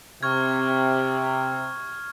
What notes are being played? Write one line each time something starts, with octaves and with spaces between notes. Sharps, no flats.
C3 C#6 F6 G#6